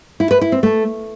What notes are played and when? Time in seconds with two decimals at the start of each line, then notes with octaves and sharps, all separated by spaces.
0.20 E4
0.31 B4
0.41 E4
0.52 C4
0.63 A3